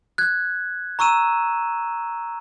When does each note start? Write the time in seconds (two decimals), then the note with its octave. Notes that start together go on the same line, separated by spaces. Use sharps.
0.18 F#6 G#6
0.99 A#5 C#6 E6 D#7 E7